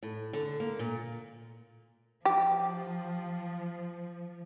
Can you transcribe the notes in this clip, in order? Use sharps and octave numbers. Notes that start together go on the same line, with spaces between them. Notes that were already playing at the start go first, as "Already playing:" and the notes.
A2
D3
A#3
A#2
F3 G4